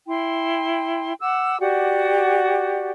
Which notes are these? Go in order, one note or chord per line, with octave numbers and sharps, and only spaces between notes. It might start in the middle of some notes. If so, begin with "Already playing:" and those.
E4 G5 C6
F#5 D6 E6
F#4 G4 D5 F#5